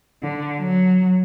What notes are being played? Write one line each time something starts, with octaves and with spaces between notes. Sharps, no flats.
D3
F#3